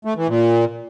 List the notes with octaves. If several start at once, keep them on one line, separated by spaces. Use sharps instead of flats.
A3
E3
A#2